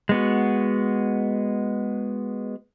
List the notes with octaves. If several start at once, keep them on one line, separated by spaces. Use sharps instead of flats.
G#3 B3 F#4